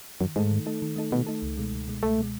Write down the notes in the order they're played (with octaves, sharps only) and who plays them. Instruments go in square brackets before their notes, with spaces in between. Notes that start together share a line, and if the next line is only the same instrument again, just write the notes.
[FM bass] F#2 [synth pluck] D#3
[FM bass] G#2 [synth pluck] A3 D#4 A4
[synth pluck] D#3
A3 D#4 A4
D#3
A3 D#4 A4
[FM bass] B2 [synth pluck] D#3
[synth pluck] A3 D#4 A4
C#2
B2 G#3
C#2
B2 G#3
[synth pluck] C#2 [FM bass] A3
[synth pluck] B2 G#3